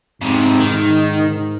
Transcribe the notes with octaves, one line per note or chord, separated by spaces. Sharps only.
F2 G#2 C3
D#3